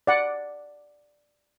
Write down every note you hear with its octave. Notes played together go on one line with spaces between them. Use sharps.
D5 F#5